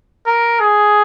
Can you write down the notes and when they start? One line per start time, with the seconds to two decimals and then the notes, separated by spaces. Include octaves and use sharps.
0.27 A#4
0.60 G#4